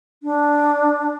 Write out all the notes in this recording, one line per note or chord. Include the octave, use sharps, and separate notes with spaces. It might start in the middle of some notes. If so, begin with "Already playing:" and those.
D4